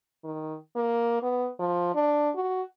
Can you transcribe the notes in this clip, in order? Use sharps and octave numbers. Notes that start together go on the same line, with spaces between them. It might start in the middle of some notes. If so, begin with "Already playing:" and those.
D#3
A#3
B3
F3
D4
F#4